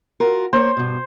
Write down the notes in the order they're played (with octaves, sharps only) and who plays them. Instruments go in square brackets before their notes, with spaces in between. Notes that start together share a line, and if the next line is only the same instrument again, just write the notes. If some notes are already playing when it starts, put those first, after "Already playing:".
[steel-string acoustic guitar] F4 F#4 A#4
[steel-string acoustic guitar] A#3 C#5 [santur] C5
[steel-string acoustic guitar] G2 B2